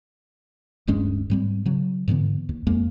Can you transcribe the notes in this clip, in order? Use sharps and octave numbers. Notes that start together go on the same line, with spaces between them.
D1 G2 G#3 C#4
G#2 G3 C4
C#3 F#3
G#2 D3 E3 B3
D#2
F2 G#3 A#3